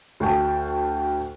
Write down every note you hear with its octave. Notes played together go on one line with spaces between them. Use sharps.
D2 F#4 G5 A5